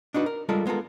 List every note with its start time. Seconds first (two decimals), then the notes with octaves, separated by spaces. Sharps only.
0.14 D4 D#4 F#4 B4
0.26 A#4
0.49 G3 G#3 F4 A4 A#4
0.66 G#3 B3 F4 A4 A#4